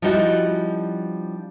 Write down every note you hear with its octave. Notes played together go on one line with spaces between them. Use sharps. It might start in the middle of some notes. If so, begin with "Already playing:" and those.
F3 G3 C#4 D#4 E4 F#4